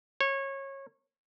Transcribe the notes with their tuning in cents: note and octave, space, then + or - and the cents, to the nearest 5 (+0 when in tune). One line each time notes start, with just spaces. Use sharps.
C#5 -20